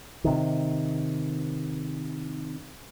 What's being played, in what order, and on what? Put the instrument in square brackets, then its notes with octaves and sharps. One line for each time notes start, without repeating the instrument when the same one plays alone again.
[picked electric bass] C3 D#3